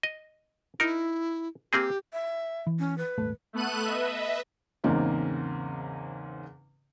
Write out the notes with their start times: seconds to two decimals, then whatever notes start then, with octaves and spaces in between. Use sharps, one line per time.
0.03 D#5
0.80 D#4 E4 A#4
1.73 A#3 C4 G4 G#4
2.13 E5
2.67 E3
2.79 C#4
2.98 B4
3.18 D#1 G#1 A3
3.53 A3 B3 A4 F#6 D#7
3.84 B4 D#5 E5
4.84 E2 G#2 C#3 A#3 C4 D#4